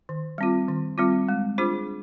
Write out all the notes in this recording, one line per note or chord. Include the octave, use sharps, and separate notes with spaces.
D#3
G3 C4 F4
D#3
G3 C4 F4
G#3
D4 F4 G#4 C5